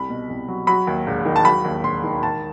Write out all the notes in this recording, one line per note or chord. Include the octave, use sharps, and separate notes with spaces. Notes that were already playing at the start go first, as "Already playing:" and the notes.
Already playing: C2 B5
B2
C2
F#3
F#3 B5
D#2
E1
D#3
A5
F#3 B5
D#2
E1 C6
D#3
E1 A5